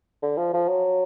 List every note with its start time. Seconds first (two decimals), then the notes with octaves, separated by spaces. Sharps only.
0.22 D3
0.38 F3
0.54 F3
0.68 F#3